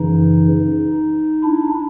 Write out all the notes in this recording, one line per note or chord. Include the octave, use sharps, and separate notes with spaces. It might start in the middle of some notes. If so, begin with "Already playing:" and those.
Already playing: F#2 C#3 E3 D#4
D4 E4